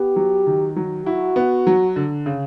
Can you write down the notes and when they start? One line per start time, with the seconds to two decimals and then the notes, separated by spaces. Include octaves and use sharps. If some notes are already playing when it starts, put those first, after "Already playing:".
Already playing: B3 G4
0.16 F#3
0.47 D#3
0.76 F#3
1.06 E4 F#4
1.36 B3
1.67 F#3
1.96 D3
2.26 C#3